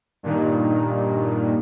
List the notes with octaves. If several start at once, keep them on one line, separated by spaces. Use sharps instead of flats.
G2 A#2 D#3